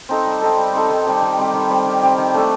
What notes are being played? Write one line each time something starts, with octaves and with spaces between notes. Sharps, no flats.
C4 D#4 A4
G3
C4 D#4 A4
G3
C4 D#4 A4
D#3
G3 C4 G4
D#3
G3 C4 G4
D#3
G3 C4 G4
D#3
G3 C4 G4
D#3
A3 D4 A4